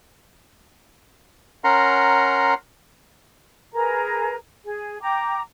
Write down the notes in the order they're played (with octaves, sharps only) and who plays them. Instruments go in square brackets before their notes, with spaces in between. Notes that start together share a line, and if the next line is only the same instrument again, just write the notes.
[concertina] C#4 A#4 F#5 A#5 C6
[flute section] G#4 A#4 B4 A#5
G#4
G5 A#5 D6